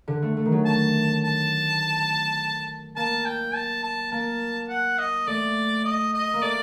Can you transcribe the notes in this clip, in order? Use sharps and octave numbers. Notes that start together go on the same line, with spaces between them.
D3
A3
A3
D#3
F#3
A5
A5
A#3 A5
G5
A5
A5
A#3 A5
F#5
D#5
A3 D5
D#5
D#5
A#3
A3 D5